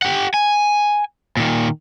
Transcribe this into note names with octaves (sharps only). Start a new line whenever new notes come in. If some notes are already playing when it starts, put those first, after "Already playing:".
G4 F#5
G#5
A#2 D#3